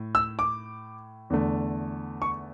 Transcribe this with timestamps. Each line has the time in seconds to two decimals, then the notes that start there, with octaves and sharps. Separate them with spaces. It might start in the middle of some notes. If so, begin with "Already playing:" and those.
Already playing: A2
0.15 E6
0.39 D6
1.30 E2 D3 A3
2.22 C#6